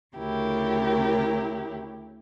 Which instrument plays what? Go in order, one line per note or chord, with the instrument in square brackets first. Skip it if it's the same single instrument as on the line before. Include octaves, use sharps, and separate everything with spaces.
[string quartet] D2 C#3 E4 G4 A#4